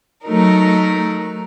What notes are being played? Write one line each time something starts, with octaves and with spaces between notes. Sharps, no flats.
F#3 A3 D#4 A#4